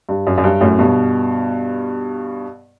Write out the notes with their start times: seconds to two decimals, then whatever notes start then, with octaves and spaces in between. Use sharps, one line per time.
0.09 G2
0.27 F#2
0.38 F#2
0.44 G2
0.61 F#2 A2
0.79 G2 B2